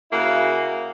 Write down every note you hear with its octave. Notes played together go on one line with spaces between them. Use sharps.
C#3 A#3 E4 F#4